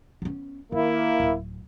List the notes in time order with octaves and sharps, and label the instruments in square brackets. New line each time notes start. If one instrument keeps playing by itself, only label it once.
[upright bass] B3 C#4
[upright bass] D#3 [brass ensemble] A#3 E4
[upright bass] D1